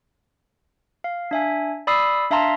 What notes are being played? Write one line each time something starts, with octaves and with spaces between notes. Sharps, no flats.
F5
D4 E5 G#5
D5 B5 D#6 E6 C7
D4 E5 F5 A5 A#5 C6